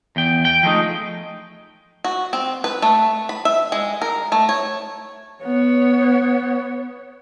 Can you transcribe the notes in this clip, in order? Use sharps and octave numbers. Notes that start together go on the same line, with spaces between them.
E2 G5
G5
F3 G#3 A3 D#4
F#4
C4
B4
A3
B5
E5
G#3
A#4
A3
C#5
B3 C#5